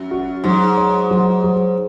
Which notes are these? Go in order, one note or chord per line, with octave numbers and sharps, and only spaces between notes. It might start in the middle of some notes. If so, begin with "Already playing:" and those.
Already playing: F#2
F#4
G#2 F#3
C#5
F#3
F#3